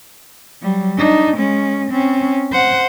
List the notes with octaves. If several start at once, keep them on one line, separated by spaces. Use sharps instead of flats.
F#3 G3
D4 D#4
G#3 C#4
C4 C#4
C5 F#5